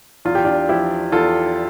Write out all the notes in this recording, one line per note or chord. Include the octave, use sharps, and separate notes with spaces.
E2 F4
G4
D4 F4
F3 E4 G4
E2 F4 A4